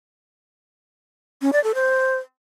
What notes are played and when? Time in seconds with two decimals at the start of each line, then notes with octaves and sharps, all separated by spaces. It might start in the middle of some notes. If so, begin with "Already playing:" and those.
1.42 C#4
1.53 D5
1.64 A4
1.75 C5